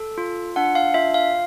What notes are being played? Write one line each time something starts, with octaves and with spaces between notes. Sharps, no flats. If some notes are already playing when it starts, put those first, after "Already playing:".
Already playing: A4
F4
D4 F#5
F5
F4 E5
F5